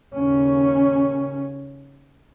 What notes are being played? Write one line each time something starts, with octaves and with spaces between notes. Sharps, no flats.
D#2 C#3 C#4